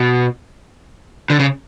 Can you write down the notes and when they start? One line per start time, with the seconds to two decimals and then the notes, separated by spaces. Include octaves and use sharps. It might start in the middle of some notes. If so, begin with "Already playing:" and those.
Already playing: B2
1.30 D3
1.39 C#3